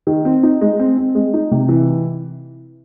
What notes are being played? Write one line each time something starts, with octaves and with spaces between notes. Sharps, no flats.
D#3
C4
D#4
G#3
C4
C4
G#3
D#4
C3
E3